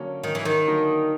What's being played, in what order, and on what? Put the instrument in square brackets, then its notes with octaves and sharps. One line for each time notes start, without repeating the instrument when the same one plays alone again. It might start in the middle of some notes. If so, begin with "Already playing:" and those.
Already playing: [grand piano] D3 F#3 A#3 C#4
[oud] D#3
E3
D#3
[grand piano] D3 F#3 A#3 D#4